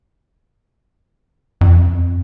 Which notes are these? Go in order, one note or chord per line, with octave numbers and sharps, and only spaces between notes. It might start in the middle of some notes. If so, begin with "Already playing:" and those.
F2